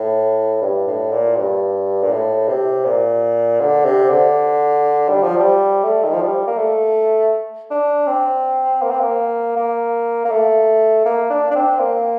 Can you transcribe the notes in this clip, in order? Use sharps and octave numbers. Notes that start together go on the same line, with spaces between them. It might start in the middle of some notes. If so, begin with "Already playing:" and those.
Already playing: A2
G2
A2
A#2
G2
A#2
A2
C3
A#2
D3
C3
D3
G3
F3
G3
A3
D#3
F3
G3
A#3
A3
D4
C4
A#3
C4
A#3
A#3
A#3
A3
A#3
D4
D4
C4
A#3